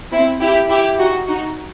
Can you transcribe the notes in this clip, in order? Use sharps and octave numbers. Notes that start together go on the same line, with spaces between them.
C4 E4
E4 G4
E4 G4
D#4 F#4
D#4 F#4